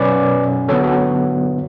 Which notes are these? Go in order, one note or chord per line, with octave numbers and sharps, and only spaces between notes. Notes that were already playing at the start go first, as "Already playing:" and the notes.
Already playing: B2 F#3 C#4 B4 D5
D3 F#3 B3 A4 C#5
F#4 A4